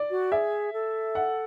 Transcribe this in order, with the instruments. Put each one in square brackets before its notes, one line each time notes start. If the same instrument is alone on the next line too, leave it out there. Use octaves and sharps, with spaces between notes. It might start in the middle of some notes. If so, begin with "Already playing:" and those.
Already playing: [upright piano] D5
[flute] F#4
[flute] G#4 [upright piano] E5
[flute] A4
[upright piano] F#5